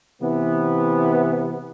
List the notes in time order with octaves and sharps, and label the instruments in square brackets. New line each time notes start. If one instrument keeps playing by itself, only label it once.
[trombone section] C3 E3 B3